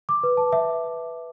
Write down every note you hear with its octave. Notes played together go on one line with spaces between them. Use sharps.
D6
B4
A5
E5